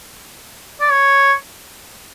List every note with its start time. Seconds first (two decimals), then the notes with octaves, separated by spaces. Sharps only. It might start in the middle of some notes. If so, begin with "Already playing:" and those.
0.81 D5
0.91 C#5